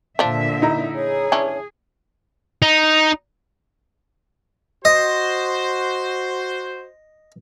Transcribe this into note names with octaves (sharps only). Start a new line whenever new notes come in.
A#2 D3 F3 D4 E5
D#4 E4 A#5
G#4 C#5
E3 C#4 D4
D#4
F#4 C5 D#5